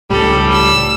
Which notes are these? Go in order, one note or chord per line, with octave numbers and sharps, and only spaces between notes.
C#2 A2 G3 A4
E6